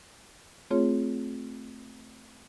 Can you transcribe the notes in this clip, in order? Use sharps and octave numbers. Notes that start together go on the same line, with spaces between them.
A3 C4 F4 G#4 C#5